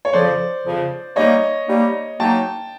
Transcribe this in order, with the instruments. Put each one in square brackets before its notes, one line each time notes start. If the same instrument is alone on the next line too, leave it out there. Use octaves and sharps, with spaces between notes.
[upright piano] C#5
[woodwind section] F2 C#3 F3 [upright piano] C5 D5
[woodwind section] F2 C#3 F3
[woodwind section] G3 A#3 D#4 [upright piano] C#5 D#5
[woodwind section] G3 A#3 D#4
[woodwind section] F#3 A#3 D#4 [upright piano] G5 A5